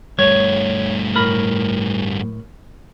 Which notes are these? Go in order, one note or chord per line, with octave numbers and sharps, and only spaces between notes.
G2 A3 C#5
A2 A#4 B5